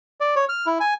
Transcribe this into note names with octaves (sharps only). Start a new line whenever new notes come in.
D5
C#5
F6
E4
G#5